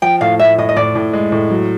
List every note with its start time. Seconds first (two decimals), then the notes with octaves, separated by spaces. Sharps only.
0.02 F3 G5
0.21 A2 F5
0.39 A2 E5
0.58 A2 D#5
0.69 D#5
0.76 A2 D5
0.95 A2
1.13 G#3
1.32 A2
1.51 F#3